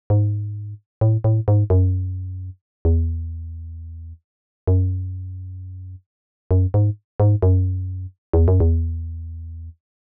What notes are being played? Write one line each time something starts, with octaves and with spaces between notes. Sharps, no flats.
G#2
A2
A2
G#2
F#2
E2
F#2
F#2
G#2
G#2
F#2
E2
F#2
E2